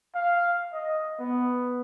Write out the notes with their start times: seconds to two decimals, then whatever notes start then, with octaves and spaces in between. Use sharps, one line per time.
0.15 F5
0.73 D#5
1.19 B3